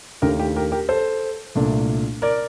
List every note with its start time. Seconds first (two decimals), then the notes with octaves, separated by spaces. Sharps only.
0.22 D#2 D#3 A3 D4 G4 A#4
0.39 G4
0.56 G4 A#4
0.72 G4 A#4
0.89 A4 C5
1.55 C2 A#2 A3 D4
2.22 A#4 D5